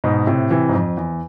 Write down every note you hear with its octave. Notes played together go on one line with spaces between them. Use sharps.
G#2 B2
A2 C3
C3 E3
G#2
F2
E2